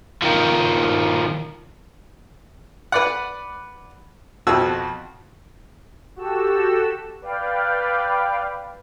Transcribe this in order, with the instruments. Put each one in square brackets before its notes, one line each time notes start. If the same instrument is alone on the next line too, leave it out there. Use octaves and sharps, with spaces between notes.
[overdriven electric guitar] D#3 F3
[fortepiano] B4 D5 F#5
F2 B2 F3 F#4 E6
[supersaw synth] F#4 G4 A4 E6
B4 D5 F5 G5